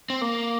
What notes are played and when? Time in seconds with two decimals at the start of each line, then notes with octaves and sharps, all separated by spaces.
0.10 C4
0.21 A#3